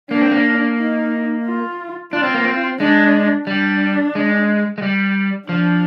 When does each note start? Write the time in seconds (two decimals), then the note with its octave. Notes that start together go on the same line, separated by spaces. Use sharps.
0.11 A#3 D4
0.22 C4
0.31 A#3
0.79 D#4
1.45 F4
2.13 D4 F4
2.23 C4
2.34 A#3
2.44 C4
2.80 G#3 D4
3.47 G3 D4
4.15 G#3
4.78 G#3
4.82 G3
5.49 F3 D4